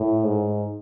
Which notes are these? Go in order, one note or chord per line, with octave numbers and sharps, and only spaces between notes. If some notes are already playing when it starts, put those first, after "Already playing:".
Already playing: A2
G#2